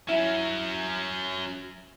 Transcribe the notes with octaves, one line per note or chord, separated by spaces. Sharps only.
F#3 C#4 E4